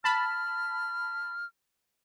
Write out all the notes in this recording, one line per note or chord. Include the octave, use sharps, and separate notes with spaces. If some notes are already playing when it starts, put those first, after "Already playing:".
A5 B5 F6